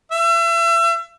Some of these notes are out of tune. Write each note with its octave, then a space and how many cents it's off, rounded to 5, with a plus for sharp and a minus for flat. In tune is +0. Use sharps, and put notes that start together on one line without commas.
E5 +35